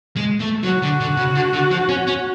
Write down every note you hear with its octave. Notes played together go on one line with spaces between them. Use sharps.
G#3
A3
F#3 F#4
D3
D3
C#3
D3
D3
F3
C#4
C#4